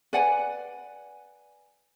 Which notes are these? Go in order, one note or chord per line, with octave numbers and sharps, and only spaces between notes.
B4 D5 F#5 G#5